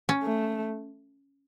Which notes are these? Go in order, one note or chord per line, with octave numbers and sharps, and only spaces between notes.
C#4
A3